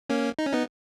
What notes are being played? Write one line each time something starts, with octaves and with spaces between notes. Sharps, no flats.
A#3 C#4
D#4
C#4
B3 D#4